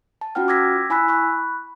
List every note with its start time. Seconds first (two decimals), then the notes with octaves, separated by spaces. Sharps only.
0.21 A5
0.35 C#4 F4 F#4 F#5 G5 F6
0.48 D6 E6 G#6 A#6 B6
0.90 E4 G#5 B5 E6 F#6 B6
1.08 B5 C#6 F#6